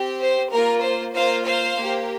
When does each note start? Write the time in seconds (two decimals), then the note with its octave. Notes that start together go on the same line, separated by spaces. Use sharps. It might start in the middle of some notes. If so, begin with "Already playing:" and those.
Already playing: C4 G4
0.21 C5
0.51 A#3 F4 A#4
0.82 C5
1.14 A#3 F4 C5 F5
1.45 C5 F5
1.76 A#3 G4